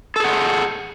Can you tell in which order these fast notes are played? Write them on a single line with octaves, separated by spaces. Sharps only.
A4 G#4 F#5